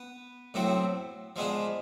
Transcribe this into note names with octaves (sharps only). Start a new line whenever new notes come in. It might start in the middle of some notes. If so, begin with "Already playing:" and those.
Already playing: B3 B4
A2 F#3 A3 C4
F3 G#3 B3 D4